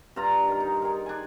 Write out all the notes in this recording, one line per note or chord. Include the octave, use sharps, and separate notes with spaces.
G2 D4 F4 A#5
D#3 A#4
D#4
G#4 A#4
D4 G#5